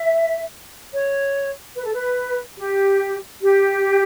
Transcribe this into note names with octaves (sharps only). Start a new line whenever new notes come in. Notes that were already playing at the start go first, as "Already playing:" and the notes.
Already playing: E5
C#5
B4
A4
B4
G4
G4